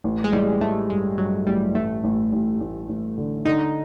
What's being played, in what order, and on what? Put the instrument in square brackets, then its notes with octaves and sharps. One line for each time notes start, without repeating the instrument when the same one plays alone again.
[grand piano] A1
[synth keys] G#3
[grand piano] A1 [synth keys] G3
[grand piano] A1 [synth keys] A3
[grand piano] G2 [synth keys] G#3
[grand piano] G2 [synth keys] F#3
[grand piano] A1 [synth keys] G3
[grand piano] A1 [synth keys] A3
[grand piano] A1
A1
A1
A1
D3
[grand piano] D3 [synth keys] D#4